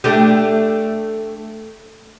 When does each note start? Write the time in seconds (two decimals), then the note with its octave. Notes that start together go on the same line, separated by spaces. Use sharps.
0.04 A3 D4 G4